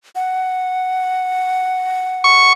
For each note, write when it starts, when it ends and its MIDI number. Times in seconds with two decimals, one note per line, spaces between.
0.15 2.52 78
2.24 2.53 85